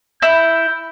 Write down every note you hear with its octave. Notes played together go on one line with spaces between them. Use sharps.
E4 G6